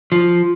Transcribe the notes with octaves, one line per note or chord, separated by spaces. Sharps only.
F3